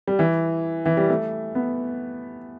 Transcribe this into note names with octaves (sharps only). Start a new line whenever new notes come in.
G3
E3
E3
G3
A3
B3